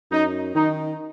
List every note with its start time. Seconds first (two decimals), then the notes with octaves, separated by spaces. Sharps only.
0.11 F#2 D#4
0.55 D#3 D#4